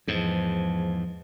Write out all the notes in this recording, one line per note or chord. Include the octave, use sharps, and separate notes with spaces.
E2 G#2 F3